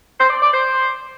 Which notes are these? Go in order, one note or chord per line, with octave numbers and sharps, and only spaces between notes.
C5
D5
D5
C5